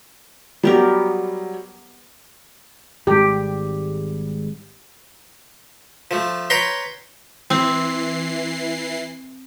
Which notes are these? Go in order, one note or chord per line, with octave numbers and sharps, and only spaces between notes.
F#3 G3 B3 G4 A#4
G#1 G#2 G3 G4
F3 A3
B4 C#5 G5 A#5 C6
E3 C4 C7